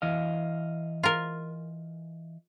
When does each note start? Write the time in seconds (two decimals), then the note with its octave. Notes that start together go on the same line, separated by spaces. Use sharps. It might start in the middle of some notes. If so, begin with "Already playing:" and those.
0.02 E3 D#5 F5
1.03 F4 A#4